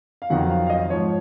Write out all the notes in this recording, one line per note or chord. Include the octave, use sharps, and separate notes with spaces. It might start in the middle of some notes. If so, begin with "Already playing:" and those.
F5
F2 D#3 F#3 F#5
F5
F5
D#5
G#2 F3 C#5